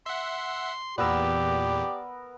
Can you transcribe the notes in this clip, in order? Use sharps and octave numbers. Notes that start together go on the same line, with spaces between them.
E5 F#5 C6
E2 A#2 B3 G4 A#4 D5 E6